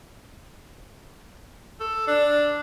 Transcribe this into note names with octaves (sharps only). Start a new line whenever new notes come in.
A4
D4